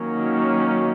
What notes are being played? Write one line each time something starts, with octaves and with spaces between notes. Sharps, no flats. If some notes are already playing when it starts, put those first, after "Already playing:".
Already playing: D#3 F#3 A#3 C#4